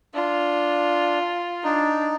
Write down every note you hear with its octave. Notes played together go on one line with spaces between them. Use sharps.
D4 F4
D4 D#4